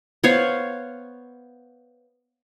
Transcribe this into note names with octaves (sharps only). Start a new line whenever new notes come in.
B3 C5 C#5 F5